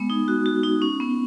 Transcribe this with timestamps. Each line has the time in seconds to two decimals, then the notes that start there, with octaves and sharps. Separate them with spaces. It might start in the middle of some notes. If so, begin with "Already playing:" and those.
Already playing: G#3 B3
0.10 D#4
0.28 F#4
0.46 F#4
0.63 D#4
0.82 C#4
1.00 B3